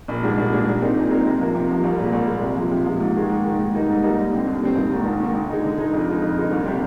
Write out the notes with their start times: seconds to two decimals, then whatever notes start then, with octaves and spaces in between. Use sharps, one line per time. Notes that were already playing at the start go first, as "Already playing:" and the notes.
0.08 A#1
0.22 G#2 G3 D4 G#4
0.37 A#1
0.52 G#2 G3 D4 G#4
0.66 A#2
0.81 G#3 C4 D#4 A#4
0.96 A#2
1.10 G#3 C4 D#4 A#4
1.25 C3
1.40 F3 A#3
1.55 C3
1.69 F3 A#3
1.83 C2
1.98 A#2 G#3
2.13 C2
2.27 A#2 G#3
2.42 C3
2.56 F3 G#3
2.71 C3
2.86 F3 G#3
3.00 G#2
3.15 D#3 G#3
3.29 G#2
3.44 D#3 G#3
3.59 G#2
3.74 G3 A#3 D#4
3.88 G#2
4.03 G3 A#3 D#4
4.18 D#2
4.32 D3 G3 C4
4.47 D#2
4.61 D3 G3 C4
4.75 G#1
4.90 G#2 D#3
5.05 G#1
5.20 G#2 D#3
5.34 D3
5.49 G#3 D#4
5.64 D3
5.78 G#3 D#4
5.93 F2
6.08 D3 G#3 D#4
6.22 F2
6.37 D3 G#3 D#4
6.51 C2
6.66 C3 G3 D4 G4